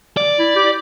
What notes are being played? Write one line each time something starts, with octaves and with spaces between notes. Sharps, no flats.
D5
E4
G4